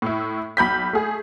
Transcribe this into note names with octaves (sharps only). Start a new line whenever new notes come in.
A2 E4
B1 B5 G6 B6
A3 G#4